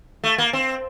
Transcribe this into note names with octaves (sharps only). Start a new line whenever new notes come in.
A3
A#3
C4